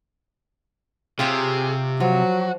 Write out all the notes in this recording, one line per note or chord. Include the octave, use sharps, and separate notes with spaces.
C3 F4 G4 G#4 C#5
F3 F#3 F#4